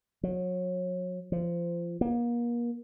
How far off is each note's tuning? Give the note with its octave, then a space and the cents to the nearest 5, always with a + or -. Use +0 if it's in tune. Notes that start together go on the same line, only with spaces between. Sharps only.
F#3 -30
F3 -25
A#3 +35